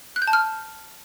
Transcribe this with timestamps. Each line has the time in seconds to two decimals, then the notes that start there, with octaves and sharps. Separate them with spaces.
0.16 F#6
0.22 G6
0.27 A5
0.33 F6